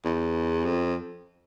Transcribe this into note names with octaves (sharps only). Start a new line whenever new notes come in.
E2
F2